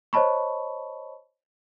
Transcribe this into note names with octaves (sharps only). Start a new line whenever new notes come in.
C5 C#5 D#5 A5 B5 C#6